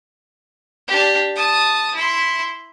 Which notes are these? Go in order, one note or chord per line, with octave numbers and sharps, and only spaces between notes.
D4 G4
A5 D#6
E4 C6